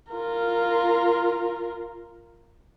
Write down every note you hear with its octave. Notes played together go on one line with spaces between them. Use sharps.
F4 A#4